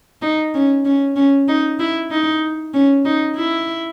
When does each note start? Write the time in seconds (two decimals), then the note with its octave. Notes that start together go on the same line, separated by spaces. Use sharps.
0.22 D#4
0.55 C#4
0.85 C#4
1.16 C#4
1.48 D#4
1.79 E4
2.11 D#4
2.74 C#4
3.05 D#4
3.36 E4